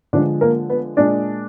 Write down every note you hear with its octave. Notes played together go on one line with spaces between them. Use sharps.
D3 F3 G#3 D4 D5
A#3 A#4
B3 B4
A#2 G#3 D4 D5